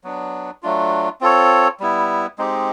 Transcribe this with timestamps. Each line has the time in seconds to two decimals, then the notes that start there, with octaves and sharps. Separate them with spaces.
0.04 F#3 B3 D4
0.63 F#3 A3 D4 F4
1.21 C4 F4 A4 C#5
1.80 G3 B3 E4
2.38 G#3 C4 D#4 G4